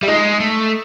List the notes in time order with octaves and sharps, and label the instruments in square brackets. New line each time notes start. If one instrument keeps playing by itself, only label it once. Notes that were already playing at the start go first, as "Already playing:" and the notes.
[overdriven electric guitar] G3 [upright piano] E5
[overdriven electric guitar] G#3 [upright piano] D#4 D#5
[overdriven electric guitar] A3